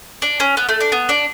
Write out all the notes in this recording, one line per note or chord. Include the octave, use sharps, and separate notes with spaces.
D4
C#4
B3
A3
D4
B3
D4